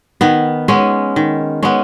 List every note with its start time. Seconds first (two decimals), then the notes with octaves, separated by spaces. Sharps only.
0.21 D#3 B3
0.68 G#3 B3 C#4
1.16 D#3
1.63 G#3 B3 C#4